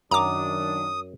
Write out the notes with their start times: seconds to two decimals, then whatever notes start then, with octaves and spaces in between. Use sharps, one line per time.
0.11 F#2 D#3 F#3 D4 A#5 D6 D#6